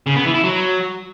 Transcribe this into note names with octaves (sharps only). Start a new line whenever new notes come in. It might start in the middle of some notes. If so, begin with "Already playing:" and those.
C#3
B3
E3
E4
F#3